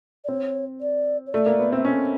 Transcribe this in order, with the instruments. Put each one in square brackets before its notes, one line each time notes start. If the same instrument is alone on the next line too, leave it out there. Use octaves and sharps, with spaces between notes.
[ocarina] D5
[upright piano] C4 [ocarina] C#5
[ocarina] D5
C#5
[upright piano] A3 [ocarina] D5
[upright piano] A#3
B3
[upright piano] C4 [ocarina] E5
[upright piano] C#4 [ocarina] D#5